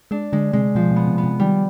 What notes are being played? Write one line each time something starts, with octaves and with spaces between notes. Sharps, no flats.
G#3 D4
D3 G#3
C3 G#3
B2 F3
B2
B3
C3
B3
C3
D#3 G3